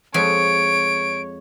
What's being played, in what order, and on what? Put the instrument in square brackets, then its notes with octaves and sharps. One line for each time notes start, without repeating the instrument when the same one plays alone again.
[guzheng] F2 G#3 G#5 [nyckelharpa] C#5 [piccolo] D7